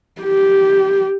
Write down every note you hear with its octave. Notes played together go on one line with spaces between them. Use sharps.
G4